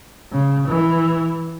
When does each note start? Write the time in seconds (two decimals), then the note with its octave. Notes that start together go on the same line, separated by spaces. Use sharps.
0.32 C#3
0.69 E3